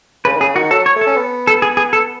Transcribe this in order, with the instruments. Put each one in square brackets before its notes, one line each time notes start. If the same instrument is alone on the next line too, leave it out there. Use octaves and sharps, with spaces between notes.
[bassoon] C#3 [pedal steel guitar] B4
[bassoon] D#3
[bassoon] C#3 [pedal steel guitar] G#4
[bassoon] D#3 [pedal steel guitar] F#4
[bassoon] F#3 [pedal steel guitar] A4
[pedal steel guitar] C#5
[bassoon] A3
[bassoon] C#4 [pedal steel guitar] A4
[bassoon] B3
[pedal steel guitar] A4
G#4
G#4
A4